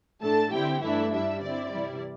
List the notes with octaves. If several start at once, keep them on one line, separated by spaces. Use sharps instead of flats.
A2 A3 D4 A4 A5
D3 C4 E4 G4 G5
G2 E3 A3 D4 E4 E5
G2 G3 D4 E4 E5
D3 C4 E4 D5
C3 E3 G3 E4